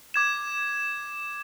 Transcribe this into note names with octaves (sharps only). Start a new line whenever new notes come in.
D6 G#6 E7